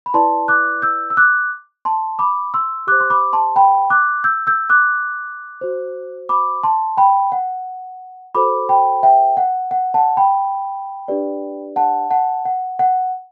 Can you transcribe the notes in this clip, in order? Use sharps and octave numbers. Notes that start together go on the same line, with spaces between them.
B5
E4 B4 D5 A5 C6
D6 F#6
E6 G6
E6
D6 F#6
A5 C6
B5 D6
C6 E6
G4 C5 D6 F#6
C6
B5 D6
A5 C6
G5 B5
D6 F#6
E6 G6
E6 G6
D6 F#6
F#4 C5
B5 D6
A5 C6
G5 B5
F#5
F#4 A4 C5 B5 D6
G5 B5
E5 G5
F#5
F#5
F#5 A5
G5 B5
D4 G4 B4 D5
F#5 A5
F#5 A5
F#5
F#5